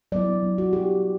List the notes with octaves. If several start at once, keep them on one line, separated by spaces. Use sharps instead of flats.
F#3 B3 E4 D5
F#3 B3 E4
F#4
F#3 B3 E4 G4